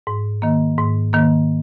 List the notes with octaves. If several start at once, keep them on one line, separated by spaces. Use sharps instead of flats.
G#2
D#3 A#3
G#2
D#3 A#3